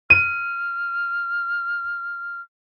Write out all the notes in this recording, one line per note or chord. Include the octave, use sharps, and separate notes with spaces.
F6 D#7